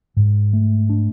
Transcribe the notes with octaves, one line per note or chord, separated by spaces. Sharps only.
G#2
A3
D4